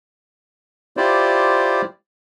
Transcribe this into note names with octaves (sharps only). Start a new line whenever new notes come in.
E4 F4 G4 C5 D5